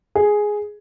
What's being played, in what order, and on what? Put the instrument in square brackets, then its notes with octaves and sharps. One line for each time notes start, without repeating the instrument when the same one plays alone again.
[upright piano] G#4